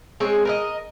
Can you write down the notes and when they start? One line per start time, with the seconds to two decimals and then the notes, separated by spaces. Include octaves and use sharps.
0.20 G#3 C4 G#4 C#5
0.45 A#4 B4 D#5